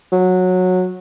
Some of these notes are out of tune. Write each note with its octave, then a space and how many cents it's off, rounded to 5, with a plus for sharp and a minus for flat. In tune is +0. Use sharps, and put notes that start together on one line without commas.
F#3 -15